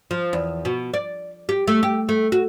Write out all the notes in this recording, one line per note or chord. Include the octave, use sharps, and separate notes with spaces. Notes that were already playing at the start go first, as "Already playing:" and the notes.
F3
E2
B2
D5
G4
A3
G4
A3
F#4